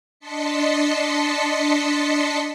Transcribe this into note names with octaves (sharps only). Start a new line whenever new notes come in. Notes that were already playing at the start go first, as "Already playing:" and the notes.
D4 D#5 A5 C6 B6 C#7